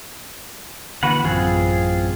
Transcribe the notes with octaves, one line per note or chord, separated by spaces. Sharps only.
D3 E3 A#3 F#4 B4 F#5
A1 F#2 C4 F4 G#4